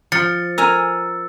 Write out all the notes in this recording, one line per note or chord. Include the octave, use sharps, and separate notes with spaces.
F3 A6 C#7
A#4 G#5 A#5 E6